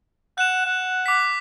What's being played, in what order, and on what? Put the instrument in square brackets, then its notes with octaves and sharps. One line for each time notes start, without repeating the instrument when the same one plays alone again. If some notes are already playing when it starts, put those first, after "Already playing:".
[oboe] F#5 [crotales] F#6 E7
[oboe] F#5
[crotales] D6 B6